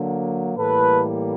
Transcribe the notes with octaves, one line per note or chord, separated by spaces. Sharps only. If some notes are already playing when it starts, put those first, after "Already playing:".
Already playing: D3 F#3 A#3
A2 E3 G3 A#3 A4 B4